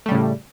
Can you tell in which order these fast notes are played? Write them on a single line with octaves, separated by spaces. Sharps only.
A3 G3 C#3 A2